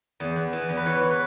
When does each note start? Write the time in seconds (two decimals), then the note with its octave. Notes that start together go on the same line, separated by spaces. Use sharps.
0.20 E2
0.36 E2
0.53 E3
0.69 E2
0.77 B4
0.86 E3 C#5
1.02 E3
1.11 B4